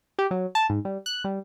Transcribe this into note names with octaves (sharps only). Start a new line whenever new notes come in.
G4
F#3
A5
G#2
G3
F#6
G3